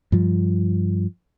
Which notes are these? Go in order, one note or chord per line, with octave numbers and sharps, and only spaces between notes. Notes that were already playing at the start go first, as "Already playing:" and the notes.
G2 F3